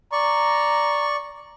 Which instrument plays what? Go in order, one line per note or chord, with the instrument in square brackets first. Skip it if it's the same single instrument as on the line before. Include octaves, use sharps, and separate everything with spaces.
[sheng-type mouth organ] D5 C#6 [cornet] A#5